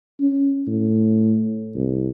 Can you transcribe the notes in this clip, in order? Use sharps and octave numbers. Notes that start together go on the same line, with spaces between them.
C#4
A2
C2